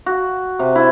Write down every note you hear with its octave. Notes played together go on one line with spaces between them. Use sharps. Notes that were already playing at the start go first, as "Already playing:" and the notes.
F#4
C3
E4